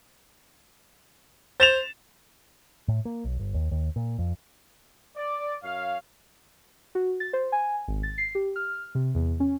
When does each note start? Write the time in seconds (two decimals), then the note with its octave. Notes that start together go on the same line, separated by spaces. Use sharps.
1.60 C5 A6 E7 F7
2.88 A2
3.05 A#3
3.24 B1
3.39 G1
3.54 D#2
3.71 D#2
3.96 A#2
4.19 F2
5.16 D5
5.64 F#2 C#5 F5
6.95 F#4
7.20 A6
7.33 C5
7.52 G#5
7.88 G#1
8.03 A6
8.18 C7
8.35 G4
8.56 F6
8.95 C3
9.15 E2
9.40 C#4